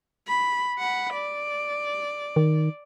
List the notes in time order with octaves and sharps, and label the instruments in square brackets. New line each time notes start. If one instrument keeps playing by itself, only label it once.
[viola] B5
F#5 B5
D5
[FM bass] D#3